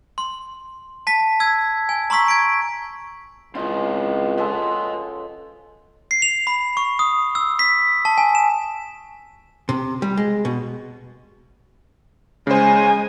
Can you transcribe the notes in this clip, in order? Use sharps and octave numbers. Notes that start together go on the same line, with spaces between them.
C6
A5 B6
E6 G#6
G#5
A#5 C6 C#6 E6 B6
G#6 B6 D7
C#2 C4 C#4 E4 F4 D#5
F3 G#3 A4 B4 D#5
C7
F7
B5
C#6
D#6
E6
B6
A5
G#5
E7
C3
G3
G#3
B2
C#3 G#3 C5 G#5